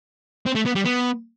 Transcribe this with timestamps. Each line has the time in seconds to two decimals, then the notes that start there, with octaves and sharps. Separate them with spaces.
0.46 C4
0.55 A3
0.66 B3
0.75 G3
0.85 B3